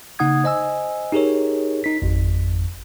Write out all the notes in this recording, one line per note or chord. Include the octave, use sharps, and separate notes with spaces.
C#3 A#3 D#4 F#5 D#6 G#6
C5 D#5 G#5 E6
D#4 G4 G#4 A#4 C#5
D#4 B6
G#1 F2